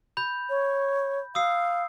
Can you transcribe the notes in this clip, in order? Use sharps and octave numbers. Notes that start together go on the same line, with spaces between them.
B5 G6
C#5
F5 D#6 E6 C7